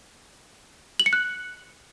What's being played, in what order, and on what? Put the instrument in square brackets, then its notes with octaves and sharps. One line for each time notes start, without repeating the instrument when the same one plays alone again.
[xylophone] F#7
C#7
F#6